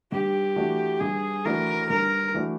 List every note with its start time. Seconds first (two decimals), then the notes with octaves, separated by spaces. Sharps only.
0.12 G2 G4
0.56 E3 A3 D4 F#4
1.00 G2 G#4
1.45 E3 A3 D4 F#4 A#4
1.90 G2 A#4
2.34 E3 A3 D4 F#4